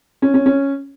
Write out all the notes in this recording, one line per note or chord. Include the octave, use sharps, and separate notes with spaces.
C#4
C#4
C#4